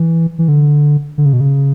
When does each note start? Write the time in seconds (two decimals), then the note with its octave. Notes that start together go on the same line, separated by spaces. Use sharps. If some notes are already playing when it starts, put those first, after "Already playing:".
Already playing: E3
0.39 E3
0.48 D3
1.18 D3
1.25 C#3
1.33 B2
1.41 C#3